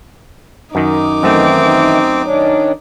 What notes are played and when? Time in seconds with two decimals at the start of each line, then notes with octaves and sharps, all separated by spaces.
0.75 F#2 D#3 D#4 D6
1.23 F#2 D#3 E3 A3 C4
2.25 D#3 C#4 D4